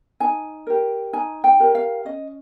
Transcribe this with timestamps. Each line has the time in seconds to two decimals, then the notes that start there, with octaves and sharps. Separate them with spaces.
0.20 D#4 G#5
0.67 G4 A#4
1.13 D#4 G#5
1.44 G5
1.60 G4 A#4
1.75 F5
2.05 C#4 D#5